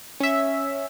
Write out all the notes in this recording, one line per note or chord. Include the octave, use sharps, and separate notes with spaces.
C#4 E5